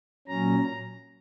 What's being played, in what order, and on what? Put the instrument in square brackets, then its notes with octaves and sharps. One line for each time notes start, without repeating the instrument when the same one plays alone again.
[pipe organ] A#2 F#3 C#4 A#5